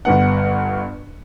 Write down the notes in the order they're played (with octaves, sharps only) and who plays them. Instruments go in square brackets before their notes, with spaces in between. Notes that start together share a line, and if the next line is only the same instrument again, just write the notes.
[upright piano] G1 G2 B3 F#5